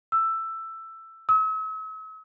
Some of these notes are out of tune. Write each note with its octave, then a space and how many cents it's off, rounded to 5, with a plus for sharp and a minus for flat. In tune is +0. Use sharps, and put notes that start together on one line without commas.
E6 +10
E6 -45